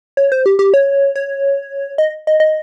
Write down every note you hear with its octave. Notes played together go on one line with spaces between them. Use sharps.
C#5
C5
G4
G4
C#5
C#5
D#5
D#5
D#5